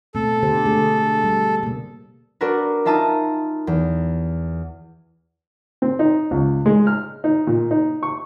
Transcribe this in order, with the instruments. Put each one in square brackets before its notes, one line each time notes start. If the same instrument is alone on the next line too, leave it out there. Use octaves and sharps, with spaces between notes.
[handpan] B2 A3 C4 [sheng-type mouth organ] A4
[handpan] D3 G4 C5
A3 G#4
D3
G3
B2 A#3
[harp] D4 F#4 A#4 B4
D#4 F4 E5 A5 A#5 D#6
E2
[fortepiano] C4
D#4
C#2
G#3
F6
D#4
A#2
D#4
C#6